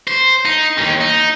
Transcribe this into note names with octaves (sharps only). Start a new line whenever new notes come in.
C5
D#4
D#2 G#2
D#4